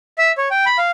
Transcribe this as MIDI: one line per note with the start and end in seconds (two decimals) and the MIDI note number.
0.18 0.32 76
0.38 0.48 73
0.51 0.65 79
0.66 0.78 83
0.78 0.91 77